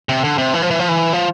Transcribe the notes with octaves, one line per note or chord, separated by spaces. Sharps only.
C3
D3
C3
E3
F3
E3
F3
E3
F3